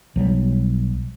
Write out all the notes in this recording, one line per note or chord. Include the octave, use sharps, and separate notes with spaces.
B1 F#3 G3